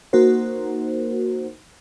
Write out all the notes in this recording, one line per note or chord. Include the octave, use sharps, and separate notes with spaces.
A#3 D#4 F#4 A#4 C5